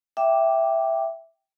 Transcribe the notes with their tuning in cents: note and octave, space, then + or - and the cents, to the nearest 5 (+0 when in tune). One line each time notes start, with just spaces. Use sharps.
E5 +0 G5 +0 D6 +0